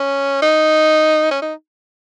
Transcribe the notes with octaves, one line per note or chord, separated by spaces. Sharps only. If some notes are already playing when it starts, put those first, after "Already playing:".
Already playing: C#4
D#4
C#4
D#4